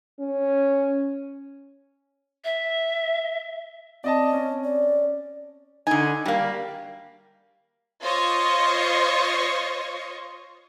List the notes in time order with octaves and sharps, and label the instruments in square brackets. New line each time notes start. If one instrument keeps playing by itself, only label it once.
[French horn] C#4
[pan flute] E5
[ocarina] C4 [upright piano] D5 D#5 A5
[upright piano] C#4
[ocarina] D5
[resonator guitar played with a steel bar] D3 D#4 [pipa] G#5
[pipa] F#3 F5 [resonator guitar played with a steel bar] G3 A#3
[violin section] F4 C5 C#5 D#5 C#6